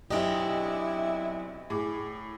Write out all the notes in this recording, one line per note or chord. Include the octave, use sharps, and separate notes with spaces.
B1 C4 D4 E4 G4 D#5
A2 G#4 D6